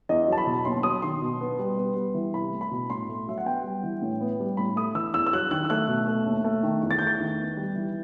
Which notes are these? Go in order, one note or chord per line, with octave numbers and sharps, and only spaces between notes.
E2 D#5
F#3 A5
B5
B2
D#2 C6
F#3 D#6
D#3 C6
B2
B3
G3
B3
G3
E3
C2 B5
A3
B5
B2
A2 C6
A3
F#3 E5
F#5
B3 G5
G3
E3
A2
B3
G3
A2 B5
A3 D#6
E3 E6
E2 E6
E6
F#3 F#6
D#3 F#6
E6
A3 F#6
B2
A3
D#2
A3
D#3
E2
A6
A3 G6
A6
D#3
B3
G3
E3